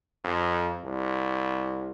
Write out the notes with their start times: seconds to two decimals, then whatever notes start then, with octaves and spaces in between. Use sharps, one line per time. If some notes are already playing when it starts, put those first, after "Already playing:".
0.24 F2
0.85 C2